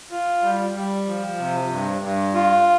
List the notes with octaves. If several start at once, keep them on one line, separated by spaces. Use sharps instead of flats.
F4
G3
G3
F3
C3
G2
G2
F4